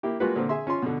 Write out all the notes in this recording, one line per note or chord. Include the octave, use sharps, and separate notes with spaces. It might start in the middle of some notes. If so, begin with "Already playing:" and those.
A#3 E4 G4
G3 G#3 A#3 F4 F#4 B4
A#2 D3 C4
G#4 E5 C6
C#4 F4 C6
B2 D3